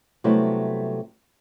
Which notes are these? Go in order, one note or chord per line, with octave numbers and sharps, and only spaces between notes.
C3 F#3 G3 A3 B3 E4